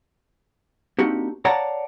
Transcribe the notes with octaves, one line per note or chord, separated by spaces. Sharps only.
A#3 C4 D4 D#4 F#4 G4
C#5 D5 F5 F#5 A5 A#5